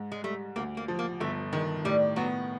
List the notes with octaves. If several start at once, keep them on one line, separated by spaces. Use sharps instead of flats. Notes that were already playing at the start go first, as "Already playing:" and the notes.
Already playing: G#2
G#3
G3 A3
D2 A#3
A#3
F3
A#3
G1 A3
D#3 G#3
A2 G3
F#3 B3